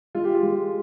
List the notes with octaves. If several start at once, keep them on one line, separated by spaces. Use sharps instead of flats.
G#3 F4
G4
F4
G#3